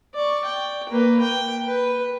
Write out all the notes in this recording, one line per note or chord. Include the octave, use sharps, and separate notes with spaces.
D5 C#6
G5
A#3 B4
G5
B4